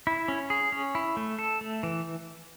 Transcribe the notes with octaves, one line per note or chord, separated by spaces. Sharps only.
E4
C#4
G#4
C#4
E4
A3
A4
A3
E3